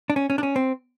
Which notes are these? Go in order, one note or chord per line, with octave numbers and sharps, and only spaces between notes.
D4
C#4
C#4
D4
C#4
C4